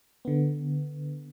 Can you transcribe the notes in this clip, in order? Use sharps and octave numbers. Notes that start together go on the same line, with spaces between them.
D3 B3